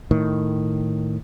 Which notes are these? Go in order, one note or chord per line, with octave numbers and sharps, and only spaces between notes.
A2 D#3